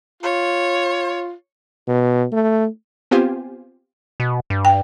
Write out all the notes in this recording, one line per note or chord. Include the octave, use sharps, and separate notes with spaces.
F4 C#5
B2
A3
B3 C4 F4 G4 C5 G#5
B2
G2
G5